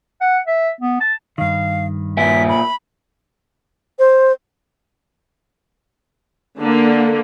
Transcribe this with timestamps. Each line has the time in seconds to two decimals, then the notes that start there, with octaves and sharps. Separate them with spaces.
0.21 F#5
0.47 E5
0.81 B3
1.00 A5
1.38 G2 D#3 F5
2.17 A#2 E5 G#5 B6
2.49 B5
3.98 C5
6.59 D3 A#3